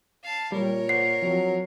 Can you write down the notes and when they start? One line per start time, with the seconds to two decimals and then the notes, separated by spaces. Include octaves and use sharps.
0.24 F5 A5
0.52 A#2 G3 A#4 C#5
0.89 C5 D5 F#5 C7
1.22 F3 F#3 C4